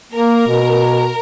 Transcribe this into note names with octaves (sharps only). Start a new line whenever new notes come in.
A#3 A#4
B2